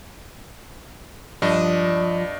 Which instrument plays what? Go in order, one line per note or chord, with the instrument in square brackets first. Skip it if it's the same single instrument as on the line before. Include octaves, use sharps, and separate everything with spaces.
[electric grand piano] G2 [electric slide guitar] F3 [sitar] D4 [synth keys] D#5